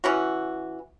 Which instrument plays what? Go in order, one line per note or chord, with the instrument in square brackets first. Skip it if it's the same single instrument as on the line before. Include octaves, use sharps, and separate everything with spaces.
[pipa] E3 C#4 F#4